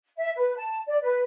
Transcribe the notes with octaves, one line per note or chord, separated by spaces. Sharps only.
E5
B4
A5
D5
B4